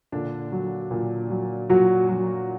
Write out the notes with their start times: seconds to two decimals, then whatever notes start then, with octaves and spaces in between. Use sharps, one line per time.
0.12 A#2 D3 D4
0.52 F#3
0.91 A#2
1.30 F#3
1.70 A#2 F#3 F#4
2.09 F#3